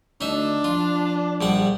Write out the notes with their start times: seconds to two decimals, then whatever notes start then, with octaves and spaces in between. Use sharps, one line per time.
0.21 D2 D4 D#4 E5
0.64 F3 F4
1.41 A#1 G3 F#5